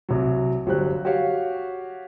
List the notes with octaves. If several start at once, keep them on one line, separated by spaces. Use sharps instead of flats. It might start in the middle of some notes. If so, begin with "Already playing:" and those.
C2 F#3
G1 F#3 G3 G4 C5 F#6
F#4 G4 C#5 F5